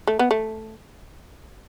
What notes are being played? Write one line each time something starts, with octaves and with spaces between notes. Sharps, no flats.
A3
B3
A3